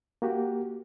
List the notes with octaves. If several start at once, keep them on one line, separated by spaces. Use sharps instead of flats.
A#3 F#4 G4